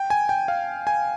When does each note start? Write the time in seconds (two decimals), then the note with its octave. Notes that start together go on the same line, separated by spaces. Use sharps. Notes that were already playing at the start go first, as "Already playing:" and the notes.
Already playing: G5
0.10 G#5
0.29 G5
0.48 F5
0.87 G#5